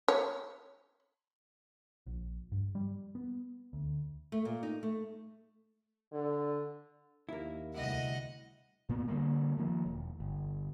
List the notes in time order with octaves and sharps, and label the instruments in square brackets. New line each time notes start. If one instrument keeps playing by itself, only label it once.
[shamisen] C#5
[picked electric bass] A#1
G2
G3
B3
D2
[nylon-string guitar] A3
A#2
D#4
A3
[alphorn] D3
[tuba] D#2 [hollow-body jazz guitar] A#3 E4
[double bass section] D2 C3 G3 [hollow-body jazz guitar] E4 [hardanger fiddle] D#5 F#5
[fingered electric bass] A#2 A#3 B3
D3 F3 G3 A#3
D#3 F3 A#3
E1
G1